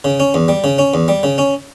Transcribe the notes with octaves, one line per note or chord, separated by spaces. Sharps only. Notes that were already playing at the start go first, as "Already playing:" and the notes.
C#3
C#4
E2
G3
C#3
C#4
E2
G3
C#3
C#4